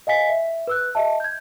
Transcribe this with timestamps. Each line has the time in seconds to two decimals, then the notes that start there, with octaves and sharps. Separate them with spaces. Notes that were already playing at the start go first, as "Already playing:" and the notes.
0.07 D#5 F5 G#5 B6
0.29 E5
0.67 B4 E6 F#6
0.95 D#5 E5 A5
1.20 G6 G#6